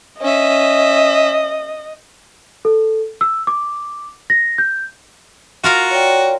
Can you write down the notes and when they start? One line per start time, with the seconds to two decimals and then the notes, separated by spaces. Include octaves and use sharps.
0.21 C#4 D#5 E5
2.65 A4
3.21 E6
3.47 D6
4.30 A#6
4.58 G6
5.64 F4 F#4 A#4 F5
5.91 C#5 D5 G5